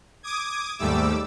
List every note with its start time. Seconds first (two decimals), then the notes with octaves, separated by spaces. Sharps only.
0.23 D6 D#6 G#6
0.78 D#2 G#2 G3 A3 D6 E6